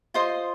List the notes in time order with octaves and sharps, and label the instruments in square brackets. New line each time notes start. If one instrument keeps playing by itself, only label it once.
[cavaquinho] F4 C5 D#5 C6